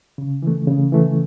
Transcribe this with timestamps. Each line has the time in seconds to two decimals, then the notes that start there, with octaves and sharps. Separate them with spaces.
0.18 C#3
0.42 E3 A3
0.67 C#3
0.92 E3 A3